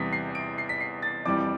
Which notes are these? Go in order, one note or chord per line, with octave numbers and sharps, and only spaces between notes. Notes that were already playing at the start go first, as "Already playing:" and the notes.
Already playing: E2 C3 E3 G3 B6
C7
D7
C7
B6
C7
A6
F2 E3 G3 D6
D6